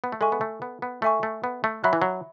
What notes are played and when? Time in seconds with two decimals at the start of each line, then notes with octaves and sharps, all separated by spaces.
0.04 B3
0.12 A3
0.21 G#3 A4 E5 G#5 C#6
0.32 B3
0.41 A3
0.62 B3
0.82 B3
1.02 A3 A4 E5 G#5 C#6
1.23 A3
1.44 B3
1.64 A3
1.84 F#3 E5 B5 F#6
1.93 E3
2.02 F#3